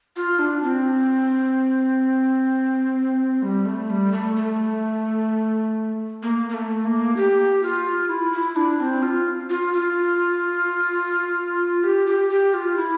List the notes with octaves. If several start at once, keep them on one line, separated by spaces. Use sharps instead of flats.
F4
D4
C4
G3
A3
G3
A3
A3
A#3
A#3
A3
A#3
G4
F4
E4
E4
D4
C4
F4
F4
F4
G4
G4
G4
F4
E4